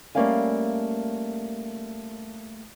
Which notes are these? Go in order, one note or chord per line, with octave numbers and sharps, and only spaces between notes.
G3 A3 A#3 C#4 F5 G#5